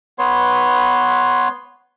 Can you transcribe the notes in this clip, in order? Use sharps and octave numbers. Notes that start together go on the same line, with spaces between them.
B3 B4 C#5 C6